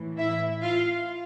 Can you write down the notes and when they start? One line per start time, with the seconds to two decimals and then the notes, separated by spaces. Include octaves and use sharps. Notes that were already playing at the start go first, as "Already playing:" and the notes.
Already playing: A2 E3
0.17 E4 E5
0.63 F4 F5